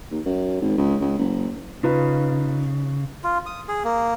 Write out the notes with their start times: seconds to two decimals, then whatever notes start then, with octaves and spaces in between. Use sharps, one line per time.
0.11 D#2
0.25 F#2
0.61 G#1
0.78 C#2
1.01 C#2
1.19 F#1
1.83 C#3 D#4 F4 B4
3.24 F4
3.46 D#6
3.69 G#4
3.85 A#3